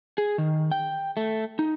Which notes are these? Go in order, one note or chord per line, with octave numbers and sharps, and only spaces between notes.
G#4
D#3
G5
A3
D#4